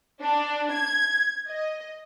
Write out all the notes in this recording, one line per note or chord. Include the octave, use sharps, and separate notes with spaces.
D4
G#6
D#5